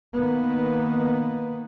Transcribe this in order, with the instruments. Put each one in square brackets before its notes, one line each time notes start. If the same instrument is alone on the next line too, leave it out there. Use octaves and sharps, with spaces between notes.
[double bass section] D#3 A#3 B3